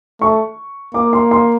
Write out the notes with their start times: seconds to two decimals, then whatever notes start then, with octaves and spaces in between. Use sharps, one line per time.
0.21 A3 C#6
0.94 A#3 D6
1.13 C6
1.31 C6